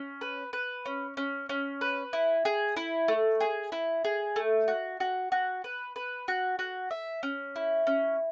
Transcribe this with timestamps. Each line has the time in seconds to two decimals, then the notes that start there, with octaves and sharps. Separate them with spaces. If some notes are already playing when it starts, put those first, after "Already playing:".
Already playing: C#4
0.21 B4
0.53 B4
0.86 C#4
1.17 C#4
1.49 C#4
1.81 B4
2.13 E4
2.45 G#4
2.76 E4
3.08 A3
3.40 G#4
3.72 E4
4.05 G#4
4.36 A3
4.68 F#4
5.00 F#4
5.32 F#4
5.64 B4
5.96 B4
6.28 F#4
6.59 F#4
6.91 E5
7.23 C#4
7.56 E4
7.87 C#4